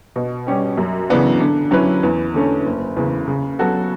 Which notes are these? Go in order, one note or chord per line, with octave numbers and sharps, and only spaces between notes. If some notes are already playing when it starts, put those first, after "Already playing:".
B2
G3 C#4 G4
F#2
C#3 E3 B3 D4
D3
F#3 C#4 E4 B4
E2
D3 A3 C#4
F#1
E2 C#3
C#3
F#3 B3 F#4 A4